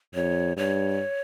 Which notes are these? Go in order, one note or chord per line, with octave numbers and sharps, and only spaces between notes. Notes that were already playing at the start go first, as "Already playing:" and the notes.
F2 C#5
G2 C#5